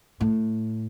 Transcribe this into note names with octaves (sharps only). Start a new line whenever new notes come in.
A2